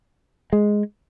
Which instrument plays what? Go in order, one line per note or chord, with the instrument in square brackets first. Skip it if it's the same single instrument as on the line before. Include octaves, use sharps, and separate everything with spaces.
[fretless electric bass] G#3